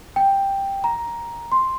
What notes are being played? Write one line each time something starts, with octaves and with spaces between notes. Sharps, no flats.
G5
A#5
C6